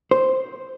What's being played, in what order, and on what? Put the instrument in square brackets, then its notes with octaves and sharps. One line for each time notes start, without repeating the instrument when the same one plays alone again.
[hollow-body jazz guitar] C5